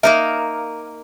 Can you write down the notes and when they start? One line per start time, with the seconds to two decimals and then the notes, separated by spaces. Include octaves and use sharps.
0.03 A#3 D#4 A#4 E5